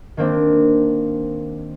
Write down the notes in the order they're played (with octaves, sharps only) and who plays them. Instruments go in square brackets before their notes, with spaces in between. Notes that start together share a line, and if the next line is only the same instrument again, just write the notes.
[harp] D#3 A#3 C4 D4